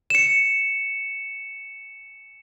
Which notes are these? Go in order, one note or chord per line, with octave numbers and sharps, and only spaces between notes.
C#7 E7